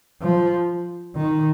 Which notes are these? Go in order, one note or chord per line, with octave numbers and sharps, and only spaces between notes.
F3
D#3